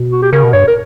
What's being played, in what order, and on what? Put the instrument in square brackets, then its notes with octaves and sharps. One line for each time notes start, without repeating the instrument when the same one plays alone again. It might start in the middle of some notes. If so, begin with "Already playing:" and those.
Already playing: [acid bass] B2
[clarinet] F#4
G4
[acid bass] C#3 [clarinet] A#4
[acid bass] B2
[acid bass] G2 [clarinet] C#5
[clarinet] A#4